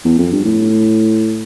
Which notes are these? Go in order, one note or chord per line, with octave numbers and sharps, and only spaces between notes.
E2
F2
G2
A2